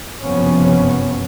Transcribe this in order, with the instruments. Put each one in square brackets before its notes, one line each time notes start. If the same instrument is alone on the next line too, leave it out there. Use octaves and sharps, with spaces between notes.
[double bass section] F#1 G2 C3 F3 B3 C#4